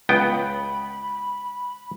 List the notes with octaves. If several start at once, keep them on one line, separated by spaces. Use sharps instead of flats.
C#2 B3 G5 B5